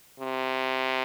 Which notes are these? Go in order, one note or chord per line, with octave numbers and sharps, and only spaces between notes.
C3